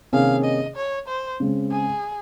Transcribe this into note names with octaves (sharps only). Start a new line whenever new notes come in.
C3 D#3 A#3 C#4 G#4 F5
D#5
C#5
C5
C#3 G#3 C4
G#4